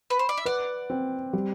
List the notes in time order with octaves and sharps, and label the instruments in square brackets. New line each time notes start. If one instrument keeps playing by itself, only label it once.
[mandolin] B4
C5
D5
E5
[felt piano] B4 [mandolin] D5 F#5
[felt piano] C4
G3